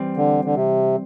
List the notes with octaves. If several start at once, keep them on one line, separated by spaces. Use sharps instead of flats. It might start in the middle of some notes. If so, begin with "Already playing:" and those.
Already playing: E3 G3 C4
D3
D3
C3